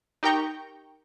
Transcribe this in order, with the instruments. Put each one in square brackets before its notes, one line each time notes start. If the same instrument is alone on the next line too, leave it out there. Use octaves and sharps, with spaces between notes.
[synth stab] D#4 G4 A#4 G5 A#5 C#6